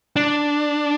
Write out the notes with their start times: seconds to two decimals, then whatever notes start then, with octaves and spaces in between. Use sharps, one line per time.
0.16 D4